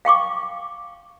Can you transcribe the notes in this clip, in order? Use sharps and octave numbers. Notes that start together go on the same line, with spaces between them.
F5 G5 C#6 D6